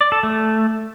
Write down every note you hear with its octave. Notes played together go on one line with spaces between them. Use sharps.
D5
A4
A3